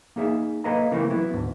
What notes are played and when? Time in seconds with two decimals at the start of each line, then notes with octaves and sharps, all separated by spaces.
0.16 A#3 D#4 G#4 E5
0.64 A#3 A4 B4 D#5 F5 A#5
0.91 C#3 E3 A3 A#3 C4
1.10 F#3 B3 E4
1.33 D2 G#2